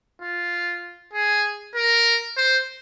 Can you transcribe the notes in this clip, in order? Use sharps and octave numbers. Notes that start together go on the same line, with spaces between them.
F4
G#4
A#4
C5